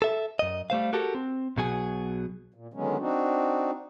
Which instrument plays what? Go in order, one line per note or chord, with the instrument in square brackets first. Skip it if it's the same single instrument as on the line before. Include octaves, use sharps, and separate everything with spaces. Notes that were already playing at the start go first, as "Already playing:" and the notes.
[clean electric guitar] A4 E5
F#2 D#5
G3 A3 C5 F5
F#4 G4 A4 A#4
C4
B1 B2 F#3 G#4
[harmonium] A#2
D3 D#3 F#3 G#3 B3 C#4
C4 D4 D#4 F#4